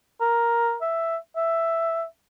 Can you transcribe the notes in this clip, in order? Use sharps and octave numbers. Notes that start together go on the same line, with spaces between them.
A#4
E5
E5